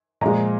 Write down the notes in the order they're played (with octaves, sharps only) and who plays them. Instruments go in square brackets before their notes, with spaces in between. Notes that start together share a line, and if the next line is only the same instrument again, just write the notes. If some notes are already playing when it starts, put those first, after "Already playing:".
[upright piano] A#2 F3 G#3 A#5